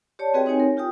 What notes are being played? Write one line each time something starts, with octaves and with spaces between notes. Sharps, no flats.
G4 C#5 D5 A5
C4 F#4 G#4 B4 D#5 G5
C4 D#4 G4 C#5 G#5
A#4
F4 G4 G5 D#6